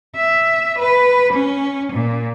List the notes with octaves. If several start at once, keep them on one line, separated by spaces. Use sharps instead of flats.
E5
B4
C#4
A#2